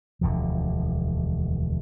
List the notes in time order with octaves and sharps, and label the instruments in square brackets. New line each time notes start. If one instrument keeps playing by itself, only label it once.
[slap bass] E1 D2 D3 F3